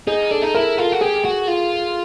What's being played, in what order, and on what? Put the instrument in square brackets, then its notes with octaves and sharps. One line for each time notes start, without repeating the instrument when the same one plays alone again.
[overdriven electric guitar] D#4 [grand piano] G#4
[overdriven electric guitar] D4 [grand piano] A4
[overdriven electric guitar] D#4
[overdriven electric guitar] E4 [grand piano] A#4
[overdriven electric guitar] F4 [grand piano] A4
[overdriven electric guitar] F#4
[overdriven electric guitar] G4 [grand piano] G#4
[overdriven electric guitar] F#4
F4